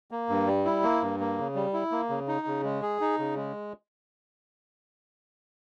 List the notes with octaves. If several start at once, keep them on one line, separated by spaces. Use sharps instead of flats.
A#3
G2
G3
E4
A#3
G2
A#3
C#3
G3
E4
A#3
C#3
D#4
C#3
G#3
G#4
D#4
C#3
G#3